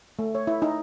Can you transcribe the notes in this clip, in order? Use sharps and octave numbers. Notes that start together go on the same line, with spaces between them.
A3
C#5
E4
D#4